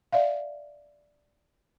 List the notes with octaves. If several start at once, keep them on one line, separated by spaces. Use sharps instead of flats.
D5 E5 F5